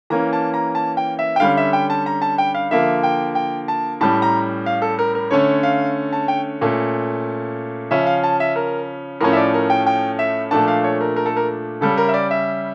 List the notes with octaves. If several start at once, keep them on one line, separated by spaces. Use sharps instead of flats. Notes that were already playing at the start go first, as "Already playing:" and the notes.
E3 A#3 C#4 A#5
A5
A#5
A5
G5
E5
G5
D3 G3 C#4 F5
E5
G5
A5
A#5
A5
G5
F5
D3 F3 A#3 E5
G5
G5
A5
A2 G3 C#4 A5
A#5
F5
A4
A#4
A#4
D3 A3 C#4 C#5
F5
A5
G5
A#2 A3 C#4
C#3 F3 C#4 E5
F5
A5
E5
A#4
A2 F3 A3 C#4 A#4
E5
D5
A#4
G5
G5
E5
A#2 F3 A3 D4 A5
F5
C#5
A#4
A#4
A4
A#4
C#3 G3 C#4 A4
A#4
E5
D5
E5